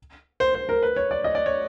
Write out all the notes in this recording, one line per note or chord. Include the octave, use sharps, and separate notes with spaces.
C5
C5
A#4
B4
C#5
D5
D#5
D5
C#5